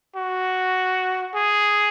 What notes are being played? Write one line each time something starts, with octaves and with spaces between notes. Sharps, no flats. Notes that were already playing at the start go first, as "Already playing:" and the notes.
F#4
G#4